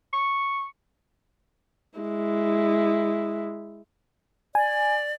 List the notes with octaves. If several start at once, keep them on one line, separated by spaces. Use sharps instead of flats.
C#6
G#3 E4
D5 G#5